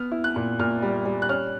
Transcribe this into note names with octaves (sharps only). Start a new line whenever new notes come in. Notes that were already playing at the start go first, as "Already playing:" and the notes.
Already playing: B3 F6
E4
F#6
A#2
A#2 F6
G3
G3
F#6
C#4 F6